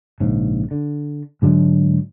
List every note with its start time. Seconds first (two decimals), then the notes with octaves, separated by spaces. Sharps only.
0.20 A#1 G#2 C#3
0.71 D3
1.42 G#2 D3 F#3 G#3